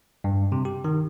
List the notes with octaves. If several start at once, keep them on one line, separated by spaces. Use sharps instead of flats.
G2
C3
G4
D#3